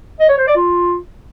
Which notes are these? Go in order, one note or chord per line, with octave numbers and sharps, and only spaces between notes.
D#5
C#5
C5
D5
F4